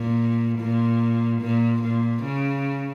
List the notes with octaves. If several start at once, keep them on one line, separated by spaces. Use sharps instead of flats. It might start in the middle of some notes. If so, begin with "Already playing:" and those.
Already playing: A#2
A#2
A#2
A#2
C#3